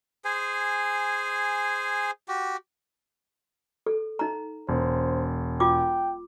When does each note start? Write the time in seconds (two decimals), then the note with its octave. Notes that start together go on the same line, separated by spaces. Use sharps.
0.25 G#4 C5 G#5
2.28 F#4 G4
3.86 A4
4.19 D#4 A#5
4.69 E1 C5
5.60 F4 G5 D6